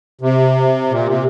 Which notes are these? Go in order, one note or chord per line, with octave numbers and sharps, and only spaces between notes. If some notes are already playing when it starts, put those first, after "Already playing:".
C3
A#2
C3